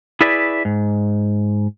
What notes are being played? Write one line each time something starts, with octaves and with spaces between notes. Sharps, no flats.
E4 G#4 B4 D5 E5
G#2